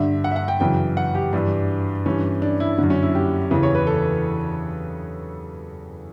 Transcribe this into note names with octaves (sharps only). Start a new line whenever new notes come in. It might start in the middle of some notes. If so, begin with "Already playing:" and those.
Already playing: G2 D3 E5
F#5
E5
F#5
G5
F#2 C#3 E3 G5
F#5
G4
G2 E3 D4
G2 E3 C#4
D4
E4
F#2 D3
C#4
E4
G4
E2 C#3 E3
C#5
B4
A4